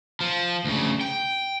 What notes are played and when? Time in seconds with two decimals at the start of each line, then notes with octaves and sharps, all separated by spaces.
0.20 F3
0.64 D2 C#3
1.01 G5